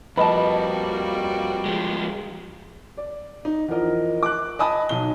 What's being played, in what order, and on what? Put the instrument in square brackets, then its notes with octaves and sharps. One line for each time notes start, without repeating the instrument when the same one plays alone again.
[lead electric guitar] F2 [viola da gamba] G3 A#3 F#4 [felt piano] B4 D#5 [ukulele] A5 B5
[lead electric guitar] F3 G#3
[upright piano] D5
D#4
E2 F3 A#4 D#5
D6 F#6
D#5 G#5 A5 B5 D#6
B1 D#4 G7